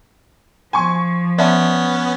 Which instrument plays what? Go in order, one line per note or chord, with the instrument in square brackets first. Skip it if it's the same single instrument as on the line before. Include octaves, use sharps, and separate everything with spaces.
[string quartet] F3 [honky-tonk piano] G#5 C6 C#6
[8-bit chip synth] B3 C#4 [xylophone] D5 E5 A5